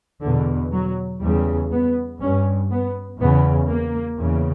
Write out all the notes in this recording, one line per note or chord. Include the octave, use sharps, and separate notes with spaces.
E2 B2 D3
F#3
E2 C#3 G3
B3
G2 C#4
B3
E2 C#3 B3
A#3
E2 C#3